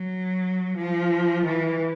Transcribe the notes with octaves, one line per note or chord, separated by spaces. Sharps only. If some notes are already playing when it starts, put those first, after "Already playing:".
Already playing: F#3
F3
E3